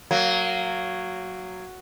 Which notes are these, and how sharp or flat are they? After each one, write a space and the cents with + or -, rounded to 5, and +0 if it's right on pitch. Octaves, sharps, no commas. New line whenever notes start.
F#3 +0 A#3 -20